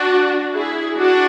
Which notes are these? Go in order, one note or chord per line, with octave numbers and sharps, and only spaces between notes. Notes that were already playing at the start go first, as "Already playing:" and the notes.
Already playing: D4 F#4
E4 G#4
D4 F#4